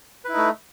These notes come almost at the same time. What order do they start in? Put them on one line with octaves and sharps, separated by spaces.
B4 E4 D#4 A3